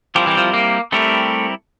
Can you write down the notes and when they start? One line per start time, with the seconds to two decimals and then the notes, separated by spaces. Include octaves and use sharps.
0.15 F3 G3 C4 E4 G4 A#4
0.27 E3
0.37 F3
0.54 A#3
0.92 G3 A3 C4 E4 G4 A#4